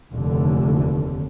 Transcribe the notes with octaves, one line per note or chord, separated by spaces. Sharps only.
F1 D#2 D3